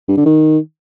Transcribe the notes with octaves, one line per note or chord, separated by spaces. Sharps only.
G2
D3
D#3